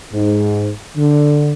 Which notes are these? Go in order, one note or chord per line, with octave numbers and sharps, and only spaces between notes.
G#2
D3